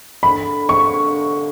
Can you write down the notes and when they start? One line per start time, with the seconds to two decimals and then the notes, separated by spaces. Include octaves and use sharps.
0.23 D3 B5
0.69 C#6